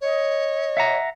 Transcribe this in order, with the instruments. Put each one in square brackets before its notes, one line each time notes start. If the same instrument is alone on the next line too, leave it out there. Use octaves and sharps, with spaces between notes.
[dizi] C#5 [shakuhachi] D#5
[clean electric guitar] E5 F#5 A#5